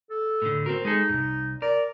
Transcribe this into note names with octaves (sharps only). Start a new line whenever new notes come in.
A4
A2 D3
C4 F#4 A#4
G#3 D#4 G#4 A4
C2 F#2
A#4 D5